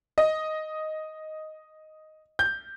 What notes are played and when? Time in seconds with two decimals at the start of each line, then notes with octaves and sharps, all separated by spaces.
0.18 D#5
2.39 G6